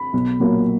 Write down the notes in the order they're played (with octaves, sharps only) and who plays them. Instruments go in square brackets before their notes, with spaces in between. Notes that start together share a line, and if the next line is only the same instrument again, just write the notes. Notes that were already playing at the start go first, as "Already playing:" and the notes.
Already playing: [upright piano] B5
B1
A#2 F#3 A#3